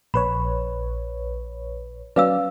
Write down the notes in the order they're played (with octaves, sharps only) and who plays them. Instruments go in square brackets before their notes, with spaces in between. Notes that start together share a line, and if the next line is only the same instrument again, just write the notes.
[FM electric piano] A#1 B4 C#5 [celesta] B5
[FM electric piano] F#3 C#4 D5 [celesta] B4 F5 E6